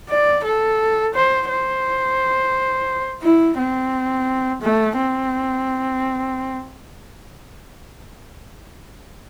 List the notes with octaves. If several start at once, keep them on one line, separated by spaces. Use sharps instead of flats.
D5
A4
C5
C5
E4
C4
A3
C4